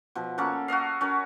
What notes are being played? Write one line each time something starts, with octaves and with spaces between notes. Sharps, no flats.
B2 F3
A#3 C#4 A4 F#5
F#4 A4 D#5 F5
C#4 F#4 A#4